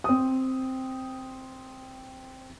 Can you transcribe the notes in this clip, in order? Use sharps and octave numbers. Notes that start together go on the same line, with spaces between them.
C4 D#6